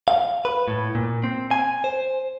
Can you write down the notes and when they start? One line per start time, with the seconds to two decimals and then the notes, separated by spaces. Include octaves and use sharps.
0.08 F5
0.45 B4
0.68 A2
0.95 A#2
1.24 C4
1.51 G#5
1.84 C5